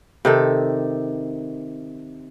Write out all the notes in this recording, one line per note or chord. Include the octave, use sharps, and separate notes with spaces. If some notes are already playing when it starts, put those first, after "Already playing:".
C3 D#3 A4